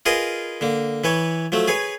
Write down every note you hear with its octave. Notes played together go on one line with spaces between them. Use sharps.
F4 G#4 A#4 B4 D#5
D3 A#3
E3 B4 C#5
F3 F#3 A3
G#4 B4 C#5